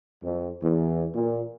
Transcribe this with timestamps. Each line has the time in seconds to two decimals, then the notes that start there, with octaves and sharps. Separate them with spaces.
0.24 F2
0.63 E2
1.15 A#2